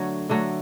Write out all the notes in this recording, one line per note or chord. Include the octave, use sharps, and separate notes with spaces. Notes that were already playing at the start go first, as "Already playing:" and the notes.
Already playing: D3 F#3 A3 C#5
D3 F#3 A3